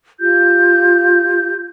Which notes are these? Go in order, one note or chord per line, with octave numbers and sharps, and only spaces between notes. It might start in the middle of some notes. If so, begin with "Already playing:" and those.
F4 G4 G6